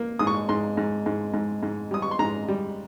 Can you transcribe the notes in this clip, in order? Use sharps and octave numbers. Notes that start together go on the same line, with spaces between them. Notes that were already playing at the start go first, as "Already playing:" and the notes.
Already playing: A#3
G#2 D#6
C#6
G#2 C6
G#2
G#2
G#2
G#2
G3 D#6
C#6
C6
G#2 A#5
G3